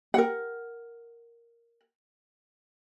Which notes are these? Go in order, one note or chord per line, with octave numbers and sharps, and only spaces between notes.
A#4 F#5